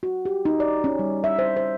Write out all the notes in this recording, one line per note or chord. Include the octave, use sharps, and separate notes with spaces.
F#4
G4
D#4
D5
C#4
G3
E5
C5
C5